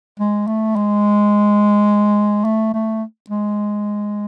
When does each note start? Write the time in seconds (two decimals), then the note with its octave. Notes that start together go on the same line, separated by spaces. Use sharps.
0.20 G#3
0.47 A3
0.76 G#3
2.45 A3
2.74 A3
3.30 G#3